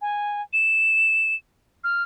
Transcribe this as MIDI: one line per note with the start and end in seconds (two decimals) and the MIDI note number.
0.02 0.42 80
0.53 1.35 100
1.84 2.03 89